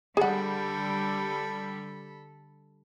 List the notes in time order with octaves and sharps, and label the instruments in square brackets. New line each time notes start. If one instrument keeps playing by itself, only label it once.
[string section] D3 G3 [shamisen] G#4 F#5 [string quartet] A4 B5